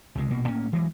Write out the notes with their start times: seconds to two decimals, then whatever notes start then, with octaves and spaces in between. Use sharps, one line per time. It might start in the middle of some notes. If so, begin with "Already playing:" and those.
0.15 C#2 C3 G#3
0.31 A#1 B2 A#3
0.48 A2 A#3 C#4
0.72 D2 E3 F#3 G#3